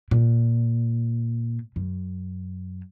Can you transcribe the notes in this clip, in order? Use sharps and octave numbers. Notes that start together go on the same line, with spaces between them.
A#2
F#2